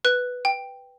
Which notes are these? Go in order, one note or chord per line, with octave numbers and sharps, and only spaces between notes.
B4 F#6
G5